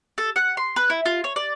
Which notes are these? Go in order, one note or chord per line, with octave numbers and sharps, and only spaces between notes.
A4
F#5
C6
B4
E4
F4
C#5
D5